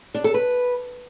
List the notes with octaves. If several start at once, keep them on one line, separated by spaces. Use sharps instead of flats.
D4
A4
B4